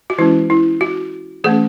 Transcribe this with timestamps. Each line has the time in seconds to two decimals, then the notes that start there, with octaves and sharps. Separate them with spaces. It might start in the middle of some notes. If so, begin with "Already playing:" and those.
0.10 F#4
0.18 E3 G#3 C#4 E4
0.50 E4
0.81 F#4
1.44 E3 A3 C#4 G#4